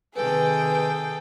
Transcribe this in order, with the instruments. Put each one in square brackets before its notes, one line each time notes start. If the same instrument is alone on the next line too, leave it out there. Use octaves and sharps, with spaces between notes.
[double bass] C3 D#3 [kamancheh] G#4 [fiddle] A4 G5 [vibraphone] B4